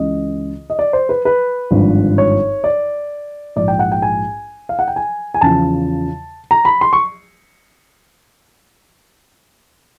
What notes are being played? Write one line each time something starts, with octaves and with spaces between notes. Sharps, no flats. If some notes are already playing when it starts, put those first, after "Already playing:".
Already playing: C#2 C#3 E3 D#5
D#5
D5
C5
B4
B4
G#1 G2 D3 F3
C#5
D5
A#1 G#2 F3 D5
G5
F#5
G5
G#5
F5
F#5
G5
G#5
G#5
E2 C#3 F3 A5
A#5
B5
C6
C#6